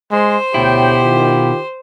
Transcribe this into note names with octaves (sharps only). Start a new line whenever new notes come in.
G#3 C5
D2 B2 E4 G4 C#5 G5
D#3 F4